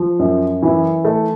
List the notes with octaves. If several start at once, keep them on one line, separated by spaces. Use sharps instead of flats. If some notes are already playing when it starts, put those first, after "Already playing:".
Already playing: F3
F#2
E3
A3